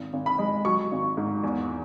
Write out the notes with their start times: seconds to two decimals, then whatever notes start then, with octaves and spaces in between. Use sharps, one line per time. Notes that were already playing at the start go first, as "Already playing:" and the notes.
Already playing: G#1
0.13 G#1
0.26 B5
0.39 G#3
0.65 F#3 C#6
0.91 G#1
1.17 G#2
1.44 E2